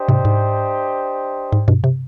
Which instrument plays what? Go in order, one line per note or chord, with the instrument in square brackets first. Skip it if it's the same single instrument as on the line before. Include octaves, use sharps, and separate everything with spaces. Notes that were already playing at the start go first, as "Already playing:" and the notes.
Already playing: [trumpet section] D4 G4 C5 D#5
[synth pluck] G#2 C3
G#2
G#2
G2 B2
C3